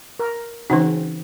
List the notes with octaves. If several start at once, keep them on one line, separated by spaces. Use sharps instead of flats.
A#4
C#3 E3 C4 D#4 F#4